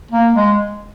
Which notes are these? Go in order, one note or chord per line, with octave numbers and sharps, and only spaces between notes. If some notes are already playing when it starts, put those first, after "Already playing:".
A#3
G#3